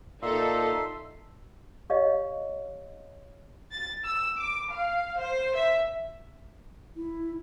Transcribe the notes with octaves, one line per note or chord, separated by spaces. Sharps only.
A#2 D#4 A4 E5 C6
G4 C#5 D#5 F5
A6
E6
D6
F5
C5
E5
E4